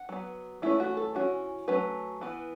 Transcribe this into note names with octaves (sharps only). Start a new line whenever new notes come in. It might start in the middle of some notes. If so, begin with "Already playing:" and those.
Already playing: F#5
F#3 B3
E3 A3 C#4 E4
F#4
A4
E3 C#4 F#4
F#3 A3 C#4 B4
E3 B3